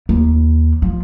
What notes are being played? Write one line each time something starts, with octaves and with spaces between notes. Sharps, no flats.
D#2
F3